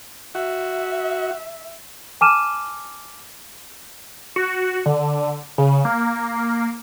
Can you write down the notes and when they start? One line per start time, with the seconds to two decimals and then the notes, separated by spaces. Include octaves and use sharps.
0.35 F#4 E5
2.21 G#5 A5 D6 F6 D#7 E7
4.36 F#4
4.86 D3
5.58 C#3
5.85 A#3